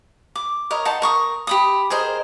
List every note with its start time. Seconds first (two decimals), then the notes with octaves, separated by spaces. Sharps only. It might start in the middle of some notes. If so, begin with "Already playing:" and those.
0.35 D6
0.71 A#4 C#5 D#5
0.85 D#4 F#5 A5 C6
1.02 A#4 C#6 D#6
1.47 G4 B5 D#6
1.90 G#4 A#4 C5 D#5